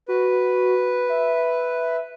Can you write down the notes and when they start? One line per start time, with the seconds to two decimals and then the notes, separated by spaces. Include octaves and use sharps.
0.08 F#4 B4
1.09 E5